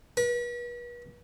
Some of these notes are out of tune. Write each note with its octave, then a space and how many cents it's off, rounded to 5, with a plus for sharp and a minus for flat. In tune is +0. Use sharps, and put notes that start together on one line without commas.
B4 -40